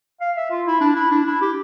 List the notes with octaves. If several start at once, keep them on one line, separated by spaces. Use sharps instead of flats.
F5
E5
F4
E4
D4
E4
D4
E4
G4